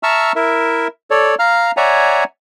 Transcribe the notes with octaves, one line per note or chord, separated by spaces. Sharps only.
E5 A5 A#5 C#6 E6 F6
E4 A#4 E5
A4 C#5 D5
F5 A#5 F6
C#5 D5 E5 F#5 G#5 A#5